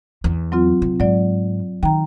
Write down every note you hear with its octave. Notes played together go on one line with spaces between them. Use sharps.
E2
F#3 C4 F4
C3
G#2 F#3 D5
D#3 G5 A#5